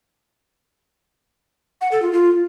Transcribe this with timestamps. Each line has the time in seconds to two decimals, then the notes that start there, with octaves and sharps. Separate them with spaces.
1.81 F#5
1.92 A4
2.02 F4
2.13 F4